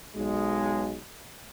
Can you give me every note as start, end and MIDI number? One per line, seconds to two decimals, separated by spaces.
0.16 0.97 35
0.16 0.97 56